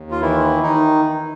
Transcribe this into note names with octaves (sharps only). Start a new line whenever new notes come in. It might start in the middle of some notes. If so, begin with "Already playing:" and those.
Already playing: D#2
F4
D#3 E3 E4
D#3 D#4